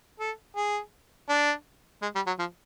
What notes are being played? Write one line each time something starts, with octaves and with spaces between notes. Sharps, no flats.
A4
G#4
D4
G#3
G3
F#3
F3